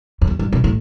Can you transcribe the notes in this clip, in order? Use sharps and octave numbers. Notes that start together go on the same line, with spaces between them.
F2
E2
G2
C3
A2